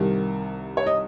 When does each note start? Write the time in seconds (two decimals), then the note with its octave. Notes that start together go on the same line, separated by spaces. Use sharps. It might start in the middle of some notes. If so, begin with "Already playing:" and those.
Already playing: C2 C3 D#3
0.77 C#5
0.86 D#5